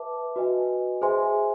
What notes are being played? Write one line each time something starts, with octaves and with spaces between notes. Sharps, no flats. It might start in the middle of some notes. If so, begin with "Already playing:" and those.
Already playing: B4 E5 A5 D6
F#4 B4 D#5 G#5
G#4 C5 E5 G#5 C6